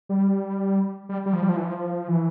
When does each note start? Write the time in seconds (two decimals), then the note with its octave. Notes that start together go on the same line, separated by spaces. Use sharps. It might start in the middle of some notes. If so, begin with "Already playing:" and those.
0.09 G3
1.09 G3
1.26 G3
1.33 F3
1.42 G3
1.49 F3
1.56 E3
1.64 F3
2.08 E3